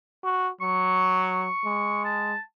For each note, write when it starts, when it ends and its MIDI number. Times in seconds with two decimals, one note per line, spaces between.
0.24 0.49 66
0.61 1.48 54
0.61 2.01 85
1.65 2.34 56
2.05 2.40 81